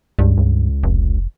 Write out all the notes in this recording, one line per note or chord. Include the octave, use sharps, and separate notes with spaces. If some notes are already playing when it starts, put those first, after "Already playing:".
C#2 G2
C#2
F1